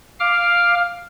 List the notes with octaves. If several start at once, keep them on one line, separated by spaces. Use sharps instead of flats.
F5 D6 F6